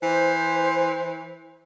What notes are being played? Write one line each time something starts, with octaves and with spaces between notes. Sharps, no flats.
E3 C5